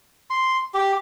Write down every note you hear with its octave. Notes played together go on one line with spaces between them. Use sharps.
C6
G4